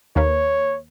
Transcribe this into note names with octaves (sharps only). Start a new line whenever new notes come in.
D#2 A#3 B4 C#5